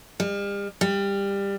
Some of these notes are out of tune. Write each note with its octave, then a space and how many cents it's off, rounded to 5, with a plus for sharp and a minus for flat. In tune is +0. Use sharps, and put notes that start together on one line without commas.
G3 +45
G3 +20